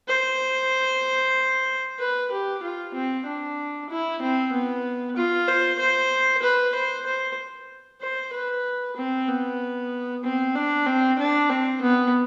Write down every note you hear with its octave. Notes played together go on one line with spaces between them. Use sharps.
C5
B4
G4
F4
C4
D4
E4
C4
B3
F4
C5
C5
B4
C5
C5
C5
B4
C4
B3
C4
D4
C4
D4
C4
B3